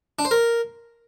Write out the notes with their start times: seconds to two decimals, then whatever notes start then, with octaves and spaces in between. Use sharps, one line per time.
0.19 D4
0.25 C5
0.31 A#4